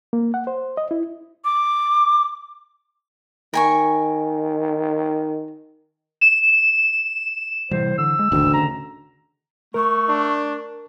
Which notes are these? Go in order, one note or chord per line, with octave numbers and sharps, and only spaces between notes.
A#3
F#5
C5
D#5
E4
D6
D#3 A#4 G#5 C#6
E7
A2 C3 E3 G3 C5
D3 E6
G#3
D#1 A1 D2 D3 D#3
C#3 A#5
A3 A#4 C#6
D4